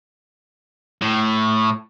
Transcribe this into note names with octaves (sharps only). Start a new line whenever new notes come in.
A2